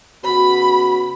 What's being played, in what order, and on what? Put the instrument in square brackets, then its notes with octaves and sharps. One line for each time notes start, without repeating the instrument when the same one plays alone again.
[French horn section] C#3 B3 F#4 [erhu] B5